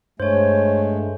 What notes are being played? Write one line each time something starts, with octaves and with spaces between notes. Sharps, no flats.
G2 G#3 A3 C5 C#5